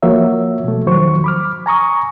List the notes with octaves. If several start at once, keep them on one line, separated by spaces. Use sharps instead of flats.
F3 A#3 F#4 C#5 E5
B2 A3
E2 D#3 F3 F#3 C5 C#6
B5 D6 F6
G#5 A#5 C#6 D#6